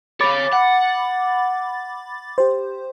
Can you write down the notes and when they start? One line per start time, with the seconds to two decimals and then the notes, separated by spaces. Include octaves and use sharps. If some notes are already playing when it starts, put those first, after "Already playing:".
0.21 C#5 F5 B5 D6 A6
0.53 F#5
2.38 G4 C5